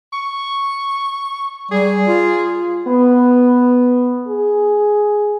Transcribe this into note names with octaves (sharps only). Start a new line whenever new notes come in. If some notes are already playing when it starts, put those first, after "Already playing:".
C#6
G3 G#4
F4
B3
G#4